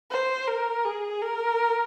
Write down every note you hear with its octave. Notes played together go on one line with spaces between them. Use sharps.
C5
A#4
G#4
A#4